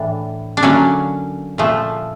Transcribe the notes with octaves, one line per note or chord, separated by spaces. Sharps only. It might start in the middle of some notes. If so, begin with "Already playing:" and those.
Already playing: A2 E3 D4
D4
D3 F#3 A#3 C#4
A#2 F3 A3